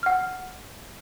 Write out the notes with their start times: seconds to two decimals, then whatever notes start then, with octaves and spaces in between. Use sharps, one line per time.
0.03 F#5 F6